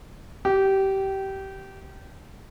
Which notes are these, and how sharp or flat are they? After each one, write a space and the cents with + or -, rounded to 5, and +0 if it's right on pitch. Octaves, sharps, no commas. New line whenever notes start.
G4 -20